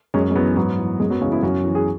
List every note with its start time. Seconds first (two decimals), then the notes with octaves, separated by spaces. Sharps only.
0.14 F#2 G#3 C#4
0.30 G#3
0.35 E3 F#3 B3
0.57 G#2 F#3 B3
0.79 E3
1.00 F#2 G#3
1.10 F#3 B3
1.21 C#3 G#3 C#4
1.24 E3
1.31 B3 E4
1.42 F#2 C#4 F#4
1.65 E3
1.75 G#4